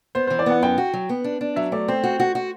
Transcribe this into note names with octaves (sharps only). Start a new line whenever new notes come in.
B3 C5
E3 C5
D5
B3 F#5
F#2 G5
F#4
F#3
B3
D4
D4
F#3 E5
A3 D5
C4 C5
F#4
F#4
F#4